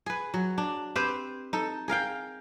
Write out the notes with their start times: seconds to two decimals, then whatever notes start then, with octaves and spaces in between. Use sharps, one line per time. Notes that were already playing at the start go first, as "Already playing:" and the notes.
0.06 G#4 B4
0.34 F#3
0.58 D4
0.96 C4 G4 B4 C5
1.53 D#4 A4
1.88 G#4 A#4 F5 G5